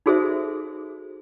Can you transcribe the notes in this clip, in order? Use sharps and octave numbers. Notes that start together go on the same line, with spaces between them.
D#4 F#4 G#4 A4 C5 E5